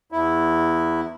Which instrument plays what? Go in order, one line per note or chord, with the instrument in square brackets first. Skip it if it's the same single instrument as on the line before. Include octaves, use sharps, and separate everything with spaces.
[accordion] E2 E4